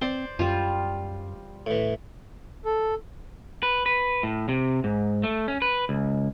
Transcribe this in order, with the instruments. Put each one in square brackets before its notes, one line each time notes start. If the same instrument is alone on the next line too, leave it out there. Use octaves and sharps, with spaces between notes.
[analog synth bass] C4 [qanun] C5 [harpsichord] D5 C6
[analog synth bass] F#2 [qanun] G3 F4
[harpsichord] A2 E3
[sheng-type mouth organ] A4
[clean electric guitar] B4
B4
A2
C3
G#2
A3
C#4
B4
C#2